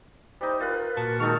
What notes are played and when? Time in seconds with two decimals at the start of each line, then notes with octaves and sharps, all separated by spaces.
0.41 G3 D#4 C5
0.61 F4 A#4 B4
0.97 A#2 F#4 A5
1.20 D#3 G#3 D#4 A4 C#6 F6